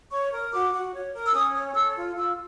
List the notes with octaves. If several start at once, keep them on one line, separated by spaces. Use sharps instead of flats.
C#5 C#6
A#4
F#4 D6
F#4
C#5
A#4
E6
C#4 D#6
C#5
A4 E6
F4
F4 E6